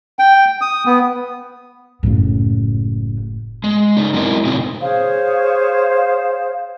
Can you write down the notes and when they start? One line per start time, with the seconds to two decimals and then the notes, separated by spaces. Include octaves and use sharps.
0.19 G5
0.61 D#6
0.86 B3
2.03 F#1 A2
3.64 G#3
3.97 C#3 D#4
4.13 F#3 G#3 C4 E4 A#4 D#5
4.45 A#2 C#3 C4 D#4 E4
4.81 G#4 C5 C#5 F5